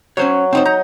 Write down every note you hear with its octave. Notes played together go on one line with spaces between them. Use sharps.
F#3 C#4 C5 C#5
C4 D#4 C5
D#4 A#5